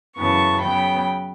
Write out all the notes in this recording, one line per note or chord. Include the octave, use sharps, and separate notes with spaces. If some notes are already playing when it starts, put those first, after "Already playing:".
F#2 C#3 E3 B3 A5 C#6
C#3 F#3 B3 G5 B5